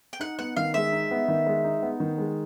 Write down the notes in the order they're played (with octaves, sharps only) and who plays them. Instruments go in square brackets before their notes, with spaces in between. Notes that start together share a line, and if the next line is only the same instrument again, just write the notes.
[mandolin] G5
[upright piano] D#4 [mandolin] F#5
[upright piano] B3 [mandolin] F#5
[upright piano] D#3 [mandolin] F5
[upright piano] G#3 [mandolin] E5
[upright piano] D#4
B3
D#3
G#3
D#4
B3
D#3
G#3